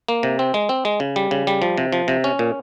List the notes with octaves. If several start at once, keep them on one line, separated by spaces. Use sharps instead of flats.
A#3
C3
C4
G#3
C4
G#3
C#3
G3
C#3
G3
F3
C3
F3
C3
C#4
A#2